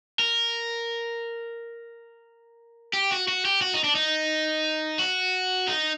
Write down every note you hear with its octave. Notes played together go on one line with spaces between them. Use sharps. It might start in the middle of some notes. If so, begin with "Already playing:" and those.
A#4
G4
F#4
F#4
G4
F#4
D#4
D4
D#4
F#4
D#4